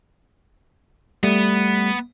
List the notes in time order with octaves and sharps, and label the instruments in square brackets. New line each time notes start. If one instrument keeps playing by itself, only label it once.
[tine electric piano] G3 A3 [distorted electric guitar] B3